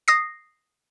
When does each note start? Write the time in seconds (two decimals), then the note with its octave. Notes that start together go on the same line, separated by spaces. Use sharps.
0.08 D#6 A#6 C7